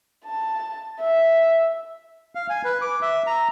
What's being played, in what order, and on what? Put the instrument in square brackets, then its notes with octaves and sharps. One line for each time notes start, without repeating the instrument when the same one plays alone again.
[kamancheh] A5
E5
[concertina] F5
G#5
B4
D6
E5
A#5